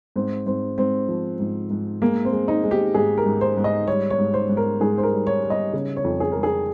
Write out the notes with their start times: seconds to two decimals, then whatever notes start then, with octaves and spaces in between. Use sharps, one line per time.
0.16 G#2 C4
0.46 G#2 C4
0.78 G#2 C4
1.09 F3
1.40 G#2
1.71 G#2
2.02 G#3 A#3
2.25 C4
2.32 G#3
2.48 D#4
2.64 G#3
2.71 G4
2.94 G#2 G#4
3.18 A#4
3.26 G#2
3.41 C5
3.57 G#2
3.64 D#5
3.88 G3 C#5
4.10 C#5
4.18 G#2
4.34 C5
4.49 G#2
4.57 A#4
4.80 G#2 G#4
4.98 C5
5.03 A#4
5.11 G3
5.27 C#5
5.43 G3
5.50 D#5
5.73 C#3 C#5
5.96 C#5
6.04 F2
6.20 G#4
6.32 G#3 A#4
6.43 G#4